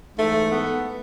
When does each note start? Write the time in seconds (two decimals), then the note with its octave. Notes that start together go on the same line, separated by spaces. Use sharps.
0.17 G#2 E3 A3
0.51 B3